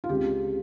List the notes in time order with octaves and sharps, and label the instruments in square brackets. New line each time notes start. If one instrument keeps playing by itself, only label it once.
[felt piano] F4
C#2 C#3 G#3 C4 G4